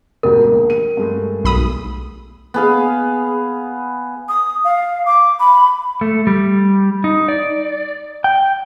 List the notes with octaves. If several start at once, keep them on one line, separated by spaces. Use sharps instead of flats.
E1 D2 G4 A#4
A#1
D#7
G2 G#3 A3
B1 B5 D#6
B3 G#4 F5
D#6
F5
D6
B5
A3
G3
D#4
D5
G5